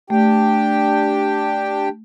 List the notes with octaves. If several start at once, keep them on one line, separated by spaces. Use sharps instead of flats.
A3 D4 G4 G5